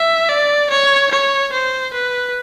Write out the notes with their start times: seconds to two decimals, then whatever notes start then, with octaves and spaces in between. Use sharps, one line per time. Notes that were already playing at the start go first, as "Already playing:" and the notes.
Already playing: E5
0.30 D5
0.71 C#5
1.12 C#5
1.53 C5
1.94 B4